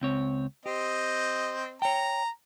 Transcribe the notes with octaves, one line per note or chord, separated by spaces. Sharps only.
C#2 C4 C#5
C4 G4 D#5
C#5 G5 A#5